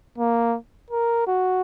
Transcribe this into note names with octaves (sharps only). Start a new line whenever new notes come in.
A#3
A#4
F#4